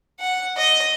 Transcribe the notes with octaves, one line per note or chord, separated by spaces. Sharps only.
F#5
D#5